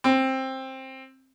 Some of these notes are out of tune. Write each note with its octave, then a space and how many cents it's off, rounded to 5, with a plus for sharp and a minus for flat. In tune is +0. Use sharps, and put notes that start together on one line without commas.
C4 +15